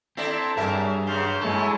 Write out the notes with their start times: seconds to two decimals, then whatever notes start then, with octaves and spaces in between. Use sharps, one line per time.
0.17 C4 E4 A4 D5 A#5 C6 A6
0.57 G2 F#3 G3 G#4 A#4 E5
1.07 C#3 F#3 C6 F6 G6
1.42 F#2 G#3 E4 A4 C#5 E5 G#5